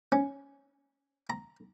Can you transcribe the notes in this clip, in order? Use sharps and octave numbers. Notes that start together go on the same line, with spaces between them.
C#4
A#5